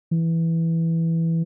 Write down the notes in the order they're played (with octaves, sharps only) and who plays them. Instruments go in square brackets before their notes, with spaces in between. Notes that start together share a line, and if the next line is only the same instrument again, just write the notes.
[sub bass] E3